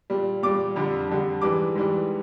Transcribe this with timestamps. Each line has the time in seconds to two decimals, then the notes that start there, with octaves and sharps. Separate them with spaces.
0.10 A#2 G3
0.43 A#2 G3 D6
0.76 F2 D3 G3
1.09 F2 D3 G3
1.42 G#2 E3 G3 D6
1.75 G#2 E3 G3